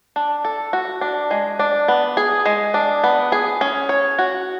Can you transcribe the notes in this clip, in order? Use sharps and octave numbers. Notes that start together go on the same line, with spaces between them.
D4
A4
F#4
D4
G#3
D4
B3
G#4
G#3
D4
B3
G#4
C#4
C#5
F#4